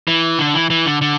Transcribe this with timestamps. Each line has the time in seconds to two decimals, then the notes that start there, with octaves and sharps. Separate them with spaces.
0.08 E3
0.39 D3
0.54 E3
0.70 E3
0.86 D3
1.01 D3